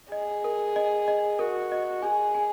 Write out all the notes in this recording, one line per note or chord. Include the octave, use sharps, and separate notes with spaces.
G#4 D#5
A#4
D#5
D#5
F#4 A#4
D#5
G#4 G#5
G#5